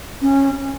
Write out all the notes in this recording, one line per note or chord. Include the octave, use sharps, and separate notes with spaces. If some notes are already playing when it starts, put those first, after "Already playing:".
C#4